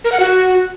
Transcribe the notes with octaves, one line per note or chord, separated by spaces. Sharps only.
A#4
F#5
F#4